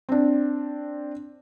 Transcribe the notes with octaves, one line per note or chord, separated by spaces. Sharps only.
C4 D4